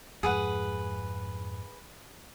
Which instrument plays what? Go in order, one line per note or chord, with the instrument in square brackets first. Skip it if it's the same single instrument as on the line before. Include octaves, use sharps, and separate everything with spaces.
[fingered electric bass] F2 G#2 [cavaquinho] G#4 B4 F#5